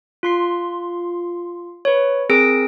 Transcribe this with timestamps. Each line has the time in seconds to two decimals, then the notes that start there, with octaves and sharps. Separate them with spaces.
0.23 F4 C6 C7
1.85 B4 C#5
2.30 C4 G#4 A#4 E6 A#6 D7